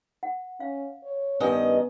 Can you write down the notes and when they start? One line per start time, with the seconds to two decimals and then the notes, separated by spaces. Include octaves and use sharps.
0.23 F#5
0.60 C#4 F5
1.04 C#5
1.40 G2 D#3 B3 C#4 D#5 G#5 D#6